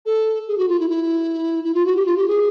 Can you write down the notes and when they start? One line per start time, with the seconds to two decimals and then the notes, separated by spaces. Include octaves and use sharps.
0.06 A4
0.48 G#4
0.58 F#4
0.68 F4
0.80 E4
0.90 E4
1.64 E4
1.74 F4
1.85 F#4
1.96 G4
2.06 F4
2.17 G4
2.28 G#4